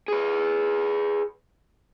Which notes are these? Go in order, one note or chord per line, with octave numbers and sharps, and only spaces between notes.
G#4 B4